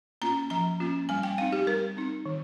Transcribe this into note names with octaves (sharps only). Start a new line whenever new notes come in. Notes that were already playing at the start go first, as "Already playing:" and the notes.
A#3 C#4 F4 A#5
F3 A#5
A#3 C#4 F4
G3 G#5
G5
C4 D#4 F5
G4
G3 A#4
C4 D#4
D#3